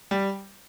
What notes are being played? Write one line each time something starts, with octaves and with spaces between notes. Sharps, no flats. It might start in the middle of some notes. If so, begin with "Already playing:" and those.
G3